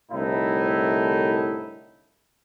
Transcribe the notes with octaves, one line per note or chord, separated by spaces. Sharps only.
C2 A2 D3 D#4 E4